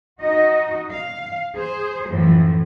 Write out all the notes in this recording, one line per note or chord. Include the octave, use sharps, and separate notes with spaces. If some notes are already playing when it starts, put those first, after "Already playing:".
D#4 F#4 D#5
F5
G#4 C5
F#2 A2 E3 F3